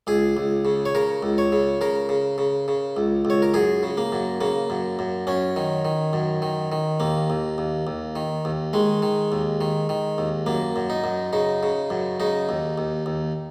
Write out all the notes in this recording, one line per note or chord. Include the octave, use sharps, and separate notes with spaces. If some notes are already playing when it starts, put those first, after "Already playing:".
C#2 G#4
C#2
C#3
C#5
C#3 A#4
C#2
C#5
C#3
C#3 A#4
C#3
C#3
C#3
C#2
C#2
C#5
A#4
F#2 G#4
C#3
A#3
F#2
C#3 A#3
F#2
F#2
F#2 C#4
D#3
D#3
F#2
D#3
D#3
D#2 A#3
D#2
D#2
D#2
D#3
D#2
D#3 G#3
D#3
D#2
D#3
D#3
D#2
F#2 A#3
F#2
D#4
F#2
C#3 D#4
C#3
F#2
C#3 D#4
D#2
D#2
D#2